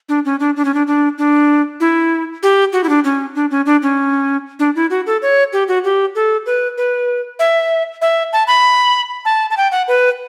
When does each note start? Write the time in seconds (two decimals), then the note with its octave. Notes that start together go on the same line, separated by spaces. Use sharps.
0.09 D4
0.25 C#4
0.40 D4
0.56 D4
0.65 C#4
0.74 D4
0.87 D4
1.18 D4
1.80 E4
2.43 G4
2.73 F#4
2.84 E4
2.89 D4
3.04 C#4
3.35 D4
3.51 C#4
3.66 D4
3.83 C#4
4.59 D4
4.76 E4
4.90 F#4
5.06 A4
5.22 C#5
5.53 G4
5.68 F#4
5.84 G4
6.15 A4
6.46 B4
6.78 B4
7.39 E5
8.02 E5
8.33 A5
8.47 B5
9.25 A5
9.50 A5
9.57 G5
9.72 F#5
9.88 B4